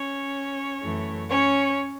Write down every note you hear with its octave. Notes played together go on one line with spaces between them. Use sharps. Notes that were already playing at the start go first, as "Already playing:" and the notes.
Already playing: C#4 C#5
F#2 E3 A3
C#4 C#5